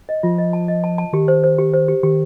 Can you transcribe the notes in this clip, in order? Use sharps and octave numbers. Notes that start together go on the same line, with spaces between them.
D#5
F3 F4
D#5
A5
D#5
A5
A5
D#3 G4
C5
C5
G4
C5
G4
D#3 G4